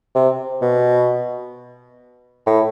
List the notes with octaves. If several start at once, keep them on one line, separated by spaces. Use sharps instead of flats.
C3
B2
A2